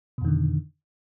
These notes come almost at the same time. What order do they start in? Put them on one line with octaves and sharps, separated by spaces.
B2 F2 D#3 D3